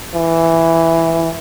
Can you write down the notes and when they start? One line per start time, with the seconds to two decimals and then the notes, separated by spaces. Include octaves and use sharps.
0.15 E3